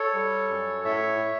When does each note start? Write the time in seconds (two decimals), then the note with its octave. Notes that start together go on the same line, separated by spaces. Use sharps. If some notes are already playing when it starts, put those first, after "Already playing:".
Already playing: A4 C#5
0.14 G3
0.49 F#2
0.84 A2 C#5 E5
1.19 A2